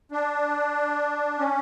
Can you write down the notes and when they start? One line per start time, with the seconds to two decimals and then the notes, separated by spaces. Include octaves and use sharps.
0.12 D4
1.38 C#4